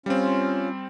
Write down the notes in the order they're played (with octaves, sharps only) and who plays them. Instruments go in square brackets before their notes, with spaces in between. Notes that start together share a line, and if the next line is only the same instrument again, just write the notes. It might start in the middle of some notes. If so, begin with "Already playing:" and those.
[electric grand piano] G3 C4 [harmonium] C#4 F4